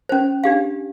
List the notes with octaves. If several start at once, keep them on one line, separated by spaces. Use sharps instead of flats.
C#4 C5
D4 G4 F5